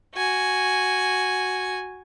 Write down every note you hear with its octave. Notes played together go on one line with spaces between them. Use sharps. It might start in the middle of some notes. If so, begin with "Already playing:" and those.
F#4 G#5